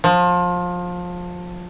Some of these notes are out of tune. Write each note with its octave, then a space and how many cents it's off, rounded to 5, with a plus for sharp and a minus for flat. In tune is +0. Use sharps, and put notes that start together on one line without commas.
F3 +25